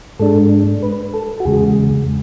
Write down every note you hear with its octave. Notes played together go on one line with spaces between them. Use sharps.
G#2 G#3 D4 A4
B4
A4
F#4
E2 C#3 G#3 G#4